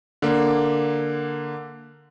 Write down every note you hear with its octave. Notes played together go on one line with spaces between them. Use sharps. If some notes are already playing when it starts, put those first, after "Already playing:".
D3 A#3